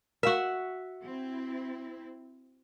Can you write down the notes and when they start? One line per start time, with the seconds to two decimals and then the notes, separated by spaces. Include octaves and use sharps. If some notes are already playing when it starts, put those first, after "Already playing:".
0.23 F#4 A#4 E5 F5
1.03 C4 E4